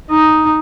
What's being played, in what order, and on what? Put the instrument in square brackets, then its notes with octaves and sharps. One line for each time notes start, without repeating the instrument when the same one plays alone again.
[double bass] D#4